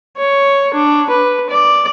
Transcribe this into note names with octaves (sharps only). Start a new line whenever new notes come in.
C#5
D4
B4
D5